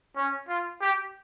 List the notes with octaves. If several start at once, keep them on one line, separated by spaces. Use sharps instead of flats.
C#4
F4
G4